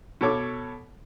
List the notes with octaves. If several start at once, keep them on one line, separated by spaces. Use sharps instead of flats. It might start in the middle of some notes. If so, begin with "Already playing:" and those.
B2 A4 C#5 D6